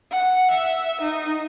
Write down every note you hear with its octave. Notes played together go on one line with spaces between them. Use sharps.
F#5
E5
D#4